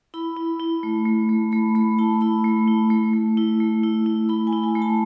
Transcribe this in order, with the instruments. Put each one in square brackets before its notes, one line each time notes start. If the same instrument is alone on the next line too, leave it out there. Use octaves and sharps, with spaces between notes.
[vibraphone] E4 B5
E4
E4
A3
A3
A3
A3 B5
A3 B5
E4 A5
E4 B5
A3
E4
A3
A3
E4
A3
E4
E4
E4 B5
G#5
E4
G#5
A3
A5